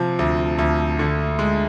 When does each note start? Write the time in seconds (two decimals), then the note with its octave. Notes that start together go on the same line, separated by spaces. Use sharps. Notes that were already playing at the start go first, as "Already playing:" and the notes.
Already playing: C3 F3
0.19 D2
0.58 D2
0.99 D3
1.39 G#3